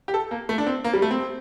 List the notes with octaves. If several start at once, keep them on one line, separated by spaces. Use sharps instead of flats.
G4
A4
A#3
A3
D4
C4
A#3
G3
A3
C4